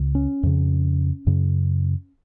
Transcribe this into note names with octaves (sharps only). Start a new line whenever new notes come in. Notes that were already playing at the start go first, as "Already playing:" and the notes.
Already playing: C#2 C#3
C#4
F2 C#3
F#2 C#3